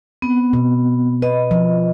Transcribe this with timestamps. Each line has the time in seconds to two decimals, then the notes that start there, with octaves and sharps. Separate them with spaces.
0.22 B3 C4
0.53 B2
1.22 B4 D#5
1.51 F3